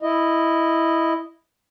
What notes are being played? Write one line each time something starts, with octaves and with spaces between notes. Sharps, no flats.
E4 D#5